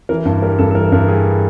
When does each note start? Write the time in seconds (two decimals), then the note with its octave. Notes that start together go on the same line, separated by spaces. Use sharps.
0.09 E3 A#4
0.25 G2
0.42 G3 A#4
0.59 G2 A4
0.71 A4
0.75 E3 A#4
0.92 G2 A#4
1.08 G3 G#4